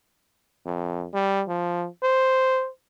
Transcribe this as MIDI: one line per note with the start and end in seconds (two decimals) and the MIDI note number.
0.66 1.07 41
1.14 1.43 55
1.48 1.87 53
2.03 2.69 72